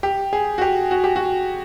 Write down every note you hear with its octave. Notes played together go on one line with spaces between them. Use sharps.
G4
G#4
F#4
G4
F#4
G4
F#4